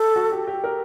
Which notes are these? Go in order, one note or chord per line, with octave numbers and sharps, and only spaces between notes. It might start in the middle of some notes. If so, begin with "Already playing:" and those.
Already playing: A4
F#4
G4
G4
A#4